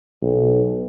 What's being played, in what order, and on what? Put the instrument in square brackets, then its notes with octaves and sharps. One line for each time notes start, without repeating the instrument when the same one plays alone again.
[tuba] B1